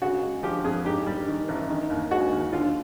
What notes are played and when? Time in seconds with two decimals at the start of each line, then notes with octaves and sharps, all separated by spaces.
0.02 C#3 F#4
0.22 G#3
0.43 F3 G4
0.64 F2 G#4
0.85 G#2 G4
1.06 G3
1.27 D#3
1.48 A1
1.69 D#3
1.90 D#2
2.11 G#3 F#4
2.32 D#2
2.53 D3 F4